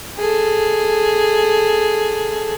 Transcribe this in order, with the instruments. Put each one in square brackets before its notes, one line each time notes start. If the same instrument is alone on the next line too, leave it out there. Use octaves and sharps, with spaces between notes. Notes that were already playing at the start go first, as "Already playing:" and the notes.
[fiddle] G#4 A4